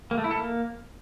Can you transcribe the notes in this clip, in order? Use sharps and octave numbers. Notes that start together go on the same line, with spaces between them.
A#3
A3
E4
A4
A#3